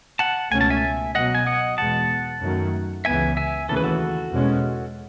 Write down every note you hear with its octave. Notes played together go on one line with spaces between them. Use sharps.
F#5 A5
C#2 B2 A3 C#4 G#5
A5
E5 G#5
B2 F#3 B3 D#5 F#5
G#5
D#5 F#5
E2 B2 G#3 F#5 A5
F#2 D#3 F#3 A3
C#2 C#3 E3 B3 E5 G#5
E5 G#5
D#2 C#3 E3 A3 A4
B4
F#4 A4
E2 B2 G#3 C#4